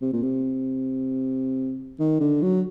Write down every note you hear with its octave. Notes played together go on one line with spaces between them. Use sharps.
C3
A#2
C3
D#3
D3
F#3